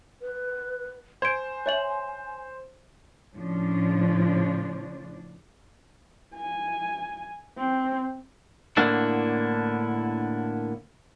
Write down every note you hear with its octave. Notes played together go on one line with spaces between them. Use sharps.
B4
C5 G#5 G#6 D7
C#5 E5 F#7
A2 C#3 F3 C#4 D4
G#5
C4
A2 D3 A#3 B3 D4 E4